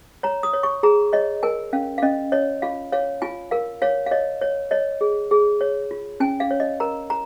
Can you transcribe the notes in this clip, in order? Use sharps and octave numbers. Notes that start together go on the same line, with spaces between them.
C#5 A#5
D#6
C#5
C#6
G#4 A#5
C#5 D#5
A#4 G#5
C#4 F5
F5
C#4 D#5
C#5 D#5
F4 F5
C#5 F5
F4 G#5
A#4 F5
C#5 F5
F5
C#5 D#5
C#5
C#5 D#5
G#4
G#4
C#5
F4
C#4 G#5
F5
C#5
D#5
A#4 A#5
A#5